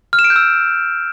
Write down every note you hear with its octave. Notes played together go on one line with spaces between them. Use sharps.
F6
E7
D7
G6
E6